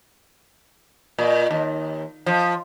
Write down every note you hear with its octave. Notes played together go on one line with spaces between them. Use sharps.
A#2
D#2
F3